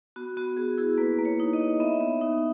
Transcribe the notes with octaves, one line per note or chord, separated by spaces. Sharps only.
B3 F#4
B3 F#4
B3 G#4
E4 G#4
A#3 B4
A#3
C#5
D#4
D#5
D#4
B3 E5
B3
D#4